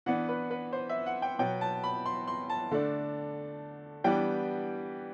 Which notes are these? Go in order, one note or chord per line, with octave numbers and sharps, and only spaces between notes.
E3 B3 D4 F#5
B4
B4
C5
E5
F#5
G5
B2 F#3 B3 G5
A5
B5
C6
C6
A5
D3 A3 D4
E3 G3 B3 D4 G5